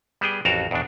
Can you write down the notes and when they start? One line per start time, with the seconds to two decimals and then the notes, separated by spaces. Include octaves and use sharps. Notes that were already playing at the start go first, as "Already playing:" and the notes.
0.21 G3 B3 G#4 G5
0.45 A1 F2 F#4 A4 A#4 F5
0.71 E2 B2 D4